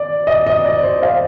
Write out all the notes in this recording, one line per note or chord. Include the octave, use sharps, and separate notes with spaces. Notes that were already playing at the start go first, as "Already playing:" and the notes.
Already playing: D5
D#5
D#5
D5
C5
F5